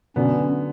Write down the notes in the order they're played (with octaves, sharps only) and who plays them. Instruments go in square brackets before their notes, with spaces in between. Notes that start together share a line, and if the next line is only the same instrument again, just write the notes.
[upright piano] D3 F#3 B3 D4 [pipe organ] C#4